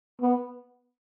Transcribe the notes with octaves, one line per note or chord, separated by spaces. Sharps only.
B3